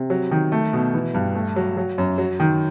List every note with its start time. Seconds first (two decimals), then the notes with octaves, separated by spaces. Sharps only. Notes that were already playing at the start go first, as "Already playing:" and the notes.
Already playing: C3
0.10 F#3
0.31 D#3
0.52 A3
0.73 B2
0.94 E3
1.14 G2
1.35 A3
1.56 F#3
1.77 F#3
1.98 F#2
2.18 F#3
2.40 D#3